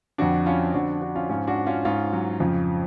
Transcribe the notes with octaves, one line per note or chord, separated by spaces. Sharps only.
F2 D3 D4 F#4
C#4 F4
F2 D3 D4 F#4
D4 F#4
C#4 F4
G#2 C#4 F4
D4 F#4
C#4 F4
G#2 C#4 F4
F#3
F2 C#3 F3